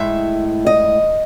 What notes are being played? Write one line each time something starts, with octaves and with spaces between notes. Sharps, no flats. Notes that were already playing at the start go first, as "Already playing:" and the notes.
Already playing: A2 G#3 E5
D#5